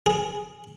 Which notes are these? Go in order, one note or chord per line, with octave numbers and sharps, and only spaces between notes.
G#4